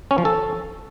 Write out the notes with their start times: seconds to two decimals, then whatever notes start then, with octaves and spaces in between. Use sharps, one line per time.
0.11 C#4
0.18 F3
0.25 A4